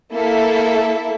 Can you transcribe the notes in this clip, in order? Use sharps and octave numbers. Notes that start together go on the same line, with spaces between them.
A#3 E4 A4 E5